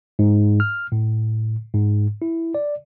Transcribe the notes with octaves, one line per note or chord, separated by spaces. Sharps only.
G#2
F6
A2
G#2
E4
D5